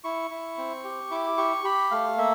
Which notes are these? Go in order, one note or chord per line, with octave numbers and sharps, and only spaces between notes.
E4 C#6
E4
C4
G4
E4 D6
G4 C#6
G4 B5
A3 F5
A#3 E5